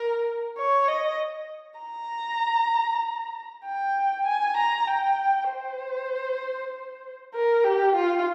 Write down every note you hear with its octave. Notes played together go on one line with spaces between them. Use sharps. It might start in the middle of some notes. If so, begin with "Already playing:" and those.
Already playing: A#4
C#5
D#5
A#5
G5
G#5
A#5
G5
C5
A#4
G4
F4